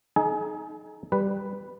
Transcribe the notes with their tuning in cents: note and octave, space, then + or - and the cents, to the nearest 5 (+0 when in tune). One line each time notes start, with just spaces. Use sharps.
D#4 +0 G#4 +40 G#5 +25
G3 +5 B4 +0